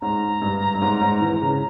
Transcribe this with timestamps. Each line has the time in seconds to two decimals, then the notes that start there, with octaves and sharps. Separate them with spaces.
0.01 G#2 A#5
0.41 G2
0.74 G2
0.82 G#2
1.01 G#2
1.21 E3
1.42 C#3